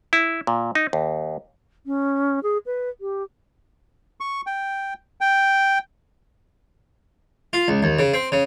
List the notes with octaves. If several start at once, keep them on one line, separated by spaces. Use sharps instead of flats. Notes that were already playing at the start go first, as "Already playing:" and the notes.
E4
A#2
D#4
D#2
C#4
G#4
B4
G4
C#6
G5
G5
F4
C#2
D#2
C#3
C4
C#3